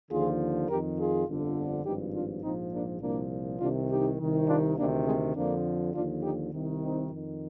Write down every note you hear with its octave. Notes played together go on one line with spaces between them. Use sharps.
D#2 D3 F3 F4 G#4
F2 D#3 G4 A#4
F4 G#4
G1 F2 D3 F3
G#1 G2 F3 D#4 G4
D4 F4
A#1 G#2 F3 C4 D#4
A#3 D4
C2 A#2 F3 A#3 D4
C2 C3 D#3 D4 F4
D#4 G4
C2 C3 D#3
D4 F4
D2 C3 D#3 A#3 D4
G#3 C4
F2 D3 F3 A#3 D4
D#2 D3 F3 D4 F4
D#4 G4
C2 C3 D#3
C4 D#4
F2 D#3